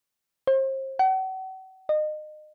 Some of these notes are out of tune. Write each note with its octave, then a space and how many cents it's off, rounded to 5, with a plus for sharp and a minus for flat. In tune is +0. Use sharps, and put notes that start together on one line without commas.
C5 +35
F#5 +40
D#5 -30